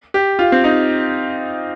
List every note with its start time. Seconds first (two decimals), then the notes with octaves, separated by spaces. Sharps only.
0.14 G4
0.39 F4
0.52 C4
0.64 D#4